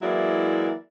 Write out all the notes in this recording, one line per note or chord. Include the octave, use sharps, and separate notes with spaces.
E3 F#3 G#3 A#3 E4 D5